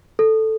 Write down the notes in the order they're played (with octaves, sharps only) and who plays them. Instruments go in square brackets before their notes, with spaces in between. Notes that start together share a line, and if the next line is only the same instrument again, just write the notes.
[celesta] A4